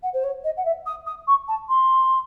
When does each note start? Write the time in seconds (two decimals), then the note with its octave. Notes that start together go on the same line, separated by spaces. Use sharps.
0.03 F#5
0.13 C5
0.23 C#5
0.44 D#5
0.57 F#5
0.65 E5
0.86 D#6
1.06 D#6
1.27 C#6
1.48 A5
1.68 C6